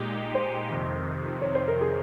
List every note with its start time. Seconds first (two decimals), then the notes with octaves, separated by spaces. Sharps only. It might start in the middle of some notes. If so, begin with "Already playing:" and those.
Already playing: A#2 G#3 D#4 G4
0.35 C5
0.70 F2 C3 D#3
1.41 C#5
1.55 C5
1.68 A#4
1.81 G#4